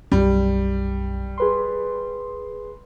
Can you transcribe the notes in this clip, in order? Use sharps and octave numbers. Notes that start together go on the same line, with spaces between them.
B1 F#2 G3
G#4 B4 C6